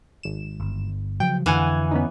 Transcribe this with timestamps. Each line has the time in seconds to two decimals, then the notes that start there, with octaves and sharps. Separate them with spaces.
0.23 G#1 E7
0.60 G1
1.20 C#3 F3 F#3 G5
1.46 F2 D3 E3 F5 F#5 G#5
1.91 B3 C#4 D#4